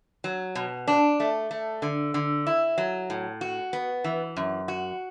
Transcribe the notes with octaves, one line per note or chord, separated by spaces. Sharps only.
F#3
B2
D4
A3
A3
D3
D3
E4
F#3
A2
F#4
B3
E3
F#2
F#4